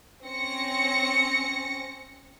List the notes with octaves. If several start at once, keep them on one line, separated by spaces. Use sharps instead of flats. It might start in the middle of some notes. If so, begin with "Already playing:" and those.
C4 C#4 A#6 C#7